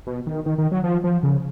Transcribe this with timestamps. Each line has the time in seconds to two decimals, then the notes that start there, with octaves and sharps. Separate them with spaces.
0.07 B2
0.27 D#3
0.46 D#3
0.58 D#3
0.72 F#3
0.84 F3
1.04 F3
1.23 C#3